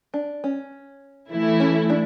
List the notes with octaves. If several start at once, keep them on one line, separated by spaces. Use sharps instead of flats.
D4
C#4
E3 A3 E4
C#4
D4